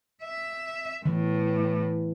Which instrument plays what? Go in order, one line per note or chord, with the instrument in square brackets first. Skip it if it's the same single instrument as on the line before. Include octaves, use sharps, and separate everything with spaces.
[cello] E5
[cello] A2 [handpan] E3